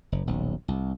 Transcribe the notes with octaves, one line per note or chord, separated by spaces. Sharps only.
F#1
D#1 B1
C2